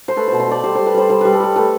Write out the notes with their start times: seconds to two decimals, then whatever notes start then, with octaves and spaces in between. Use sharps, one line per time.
0.08 C5
0.16 A3 B4
0.28 B2 C5
0.40 C5
0.48 A3 D5
0.64 G3 C5
0.75 G3 C5
0.86 B4
0.94 G3 C5
1.09 G3 C5
1.21 G3 B4
1.33 A4
1.40 G3 B4
1.56 A3 B4